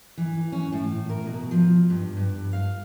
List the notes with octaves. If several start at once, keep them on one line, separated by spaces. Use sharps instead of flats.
E3
C#4
A2
A#4
B2
F3
G2
G2
F5